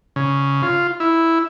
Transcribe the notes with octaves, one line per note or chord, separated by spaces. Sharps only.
C#3
F4
E4